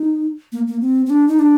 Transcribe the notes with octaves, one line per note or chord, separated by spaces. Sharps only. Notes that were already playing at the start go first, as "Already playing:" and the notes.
Already playing: D#4
A#3
A#3
C4
C4
D4
D#4
D4